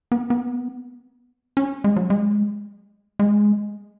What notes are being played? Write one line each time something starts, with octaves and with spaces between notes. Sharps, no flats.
B3
B3
C#4
G#3
F#3
G#3
G#3